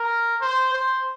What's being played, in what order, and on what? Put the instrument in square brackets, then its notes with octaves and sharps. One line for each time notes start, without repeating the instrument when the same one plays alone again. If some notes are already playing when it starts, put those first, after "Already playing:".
Already playing: [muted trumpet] A#4
C5
C5